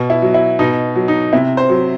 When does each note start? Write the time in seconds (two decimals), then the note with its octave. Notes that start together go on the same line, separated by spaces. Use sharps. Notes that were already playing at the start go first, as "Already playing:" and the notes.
Already playing: B2
0.10 E4
0.22 F#3
0.34 E4
0.59 B2 D#4
0.96 F#3
1.08 D#4
1.33 C3 E4
1.57 C5
1.70 F#3